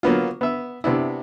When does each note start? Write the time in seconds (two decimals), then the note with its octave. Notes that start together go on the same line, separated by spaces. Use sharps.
0.03 F#3 A#3 B3 F4
0.41 B3 E5
0.84 C3 B3 D4 E4